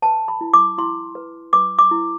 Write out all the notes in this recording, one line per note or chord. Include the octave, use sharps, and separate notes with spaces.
B4 A5
B5
E4
D6
E4 C6
B4
B4 D6
D6
E4